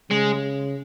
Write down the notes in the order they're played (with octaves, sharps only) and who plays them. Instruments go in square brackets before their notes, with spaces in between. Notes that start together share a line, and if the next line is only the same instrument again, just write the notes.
[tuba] C#3 [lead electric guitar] G#3